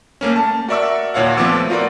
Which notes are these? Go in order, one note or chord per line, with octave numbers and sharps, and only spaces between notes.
A3 A#3 C#4
A5
F#4 A#4 D5 E5 C#6 E6
D#2 A#2 C#5 F5 F#5
F3 A3 B3 C4 D6 E6
F4 F#4 A#4 D5